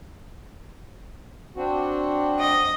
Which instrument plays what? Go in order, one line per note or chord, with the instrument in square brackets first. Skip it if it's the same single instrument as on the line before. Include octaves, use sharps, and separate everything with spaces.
[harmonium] C4 D4 F#4
[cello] D#5